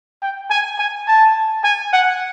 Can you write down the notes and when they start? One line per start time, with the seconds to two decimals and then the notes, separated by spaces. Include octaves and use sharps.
0.22 G5
0.50 G#5
0.78 G#5
1.07 A5
1.64 G#5
1.93 F#5